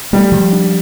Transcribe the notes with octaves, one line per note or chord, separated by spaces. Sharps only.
G3 A3
F3
D4